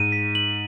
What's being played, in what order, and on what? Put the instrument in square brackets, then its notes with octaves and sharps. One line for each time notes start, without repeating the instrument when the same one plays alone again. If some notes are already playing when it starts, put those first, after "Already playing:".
Already playing: [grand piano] G#2 [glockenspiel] D#7
[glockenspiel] B6
F#7